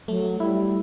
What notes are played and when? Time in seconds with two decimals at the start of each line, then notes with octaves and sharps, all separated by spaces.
0.08 F#3 A3
0.40 G3 E4